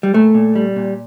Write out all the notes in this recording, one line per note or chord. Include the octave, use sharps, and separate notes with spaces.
G3
A#2 A3
A#2
G3
A#2